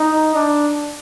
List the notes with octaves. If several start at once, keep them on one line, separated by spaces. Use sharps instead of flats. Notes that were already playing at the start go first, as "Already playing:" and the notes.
Already playing: D#4
D4